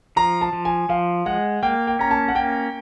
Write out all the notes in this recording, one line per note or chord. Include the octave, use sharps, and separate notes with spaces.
F3 A#5
A5
F3
G#5
F3 F5
G#3 F#5
A#3 G5
G5
C#4 A#5
A5
F#5
A#3 G5